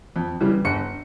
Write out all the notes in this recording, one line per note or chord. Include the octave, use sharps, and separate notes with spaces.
F2
C#3 E3 G3
G1 C#7